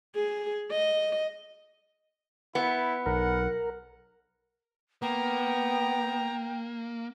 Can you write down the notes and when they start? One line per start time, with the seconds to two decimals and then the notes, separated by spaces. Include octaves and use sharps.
0.15 G#4
0.71 D#5
2.55 B3 E4
3.06 B1 A#4 F#5
5.02 A#3 B3 G5 A#5